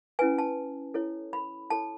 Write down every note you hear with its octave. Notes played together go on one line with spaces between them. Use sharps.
C#4 E4 B4 G#5
A5
E4 A4 C#5
B5
E4 A4 C#5 A5